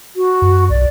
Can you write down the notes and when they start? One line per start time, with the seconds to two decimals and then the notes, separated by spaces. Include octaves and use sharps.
0.16 F#4
0.42 F#2
0.70 B1 D5